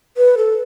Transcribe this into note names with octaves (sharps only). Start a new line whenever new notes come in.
B4
A4